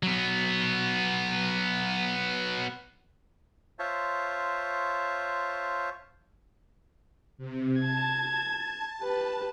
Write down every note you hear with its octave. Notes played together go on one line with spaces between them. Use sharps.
F#3 B3
F4 C5 C#5 E5 A5
C3
A5 G#6
G4 B4